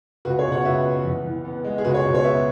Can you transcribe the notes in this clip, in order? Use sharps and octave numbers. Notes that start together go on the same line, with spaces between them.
C#2 F#4 B4
G#4 C#5
B2
C#5 F#5
C#2 B4 E5
B3
E2
E3
B3
G#3
G#4
C#2 F#4 B4
G#4 C#5
B2
G#4 C#5
B3 B4 E5